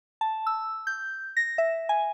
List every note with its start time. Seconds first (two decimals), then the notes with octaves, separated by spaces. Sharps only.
0.21 A5
0.47 E6
0.87 G6
1.37 A#6
1.58 E5
1.89 G#5